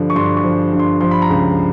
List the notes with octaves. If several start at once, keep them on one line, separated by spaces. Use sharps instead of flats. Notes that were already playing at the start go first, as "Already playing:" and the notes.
Already playing: G2 D3 F3
C#6
G2 C6
C#6
F3
G2
C6
F3 C6
B5
A#5
C#2 B5